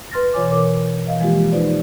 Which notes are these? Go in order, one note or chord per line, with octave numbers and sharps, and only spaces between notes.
B4 C6 F6 A6 A#6
B2 E3 F4 C#5 G#5 D6
A#4 C#5 D6
E3 D#5 F5
E3 F3 G#3 A#3 F4 G4
D#4 F4 G4 B4 C5 D5